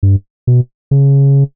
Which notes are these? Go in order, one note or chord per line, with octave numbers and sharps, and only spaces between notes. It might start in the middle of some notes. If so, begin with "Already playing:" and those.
G2
B2
C#3